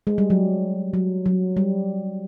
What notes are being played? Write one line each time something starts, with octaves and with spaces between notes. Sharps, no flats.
G#3
G3
F#3
F#3
F#3
G3